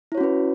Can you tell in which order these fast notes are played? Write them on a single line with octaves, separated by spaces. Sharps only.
E4 C#5 F#4 C#4 B4